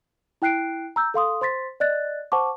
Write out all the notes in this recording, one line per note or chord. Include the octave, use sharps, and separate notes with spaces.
E4 G5 F#6 C7 D7
A#5 E6 G6
A4 F5 C6 D#6
C5 C6 A6 B6
D5 D#5 F#6 A6
C5 F#5 A5 C#6 D6